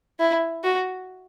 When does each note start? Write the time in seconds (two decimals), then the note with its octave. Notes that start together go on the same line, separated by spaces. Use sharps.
0.19 E4
0.64 F#4